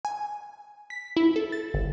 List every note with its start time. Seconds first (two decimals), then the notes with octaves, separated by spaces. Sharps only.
0.05 G#5
0.90 B6
1.17 E4
1.36 A4
1.52 A6
1.74 G1